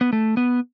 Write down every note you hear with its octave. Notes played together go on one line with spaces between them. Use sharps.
B3
A3
B3